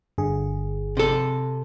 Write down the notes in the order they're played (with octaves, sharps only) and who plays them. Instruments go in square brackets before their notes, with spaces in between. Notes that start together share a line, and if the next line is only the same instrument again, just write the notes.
[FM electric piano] G1 D3 G#4
[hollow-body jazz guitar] C3 A4